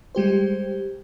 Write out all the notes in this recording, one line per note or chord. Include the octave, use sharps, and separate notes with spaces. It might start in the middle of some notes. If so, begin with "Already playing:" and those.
G3 G#3 G4 C5